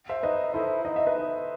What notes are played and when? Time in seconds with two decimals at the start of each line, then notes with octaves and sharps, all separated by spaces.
0.09 C5 E5
0.23 D#4 B4 D#5
0.54 E4 A4 C5
0.85 D#4 D#5
0.96 E5
1.07 B4 D#5